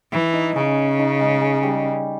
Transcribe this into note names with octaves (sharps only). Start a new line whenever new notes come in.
E3 E4
D#4
C#3 C#4
D#4
G#3
G#3
G3